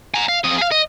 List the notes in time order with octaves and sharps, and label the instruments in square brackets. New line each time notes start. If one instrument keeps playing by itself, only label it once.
[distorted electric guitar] G#5 A#5
F5
F2 D#5
G#4 F5
D#5